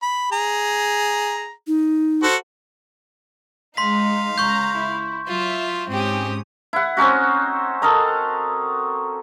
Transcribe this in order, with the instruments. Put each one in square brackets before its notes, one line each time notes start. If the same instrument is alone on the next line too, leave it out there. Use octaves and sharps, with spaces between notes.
[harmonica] B5
G#4 A#5
[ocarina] D#4
[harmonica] F#4 A4 C5
[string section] G#3 D#4 [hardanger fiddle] F5 [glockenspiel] C6 B6
[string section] C#2 A#5 [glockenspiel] C#6 G6
[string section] E4
[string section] F#3 E5 [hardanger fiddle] F4
[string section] G#2 C#4 D#6 [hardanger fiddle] C4 G4
[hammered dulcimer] E4 F#5
C4 C#4 D#4 F#4
A4 A#4 D#5 A#5